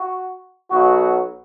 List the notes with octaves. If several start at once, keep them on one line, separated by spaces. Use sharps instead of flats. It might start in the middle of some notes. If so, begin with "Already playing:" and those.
Already playing: F#4
B1 B2 F#3 F#4